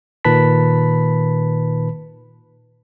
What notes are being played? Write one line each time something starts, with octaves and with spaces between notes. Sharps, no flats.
A#2 D#3 B4 A5 B5 B6